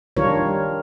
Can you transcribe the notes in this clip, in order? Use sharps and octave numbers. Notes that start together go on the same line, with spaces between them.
D#3 G3 D4 F4 A#4 C#5